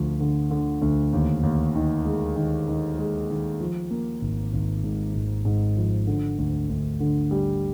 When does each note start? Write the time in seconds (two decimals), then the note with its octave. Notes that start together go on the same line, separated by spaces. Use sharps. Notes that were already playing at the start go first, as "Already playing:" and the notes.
Already playing: D2 F3
0.20 D3
0.51 D3
0.82 D2
1.13 D#2
1.43 D#2
1.75 D#3
2.05 G#3
2.36 D#3
2.68 D#3
2.98 G#3
3.30 D#3
3.60 F3
3.91 A#3
4.21 G#1
4.53 G#1
4.84 G#2
5.15 G#1
5.45 G#2
5.76 F3
6.07 D3
6.38 D2
6.69 D2
7.00 D3
7.31 G3